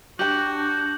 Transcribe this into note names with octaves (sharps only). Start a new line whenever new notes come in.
D4 F#4 G4 G5 D6 G6 F#7